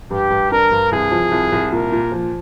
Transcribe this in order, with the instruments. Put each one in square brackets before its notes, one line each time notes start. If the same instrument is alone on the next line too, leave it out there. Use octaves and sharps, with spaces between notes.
[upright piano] G2 [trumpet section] G4
[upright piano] G2
[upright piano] D4 [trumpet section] A#4
[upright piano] G2
[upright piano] C2 [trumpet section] G#4
[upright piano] F3
C2
C2
[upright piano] A#2 [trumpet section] A#4
[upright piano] A#2
F3